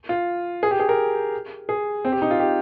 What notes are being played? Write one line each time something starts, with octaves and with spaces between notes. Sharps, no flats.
F4
G#4
G4
G#4
A#4
G#4
C4
G4
D#4
F4
G4